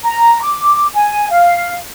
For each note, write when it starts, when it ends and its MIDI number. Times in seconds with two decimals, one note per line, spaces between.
0.05 0.39 82
0.42 0.87 86
0.94 1.27 80
1.30 1.76 77